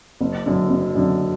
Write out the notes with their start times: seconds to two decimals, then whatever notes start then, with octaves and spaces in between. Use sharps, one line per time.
0.21 F#1
0.46 F#2 D3
0.70 F#1
0.95 F#2 D3